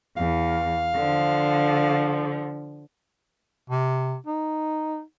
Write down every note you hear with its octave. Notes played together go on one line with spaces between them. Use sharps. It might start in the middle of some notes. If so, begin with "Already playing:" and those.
E2 F5
D3 F3
C3
D#4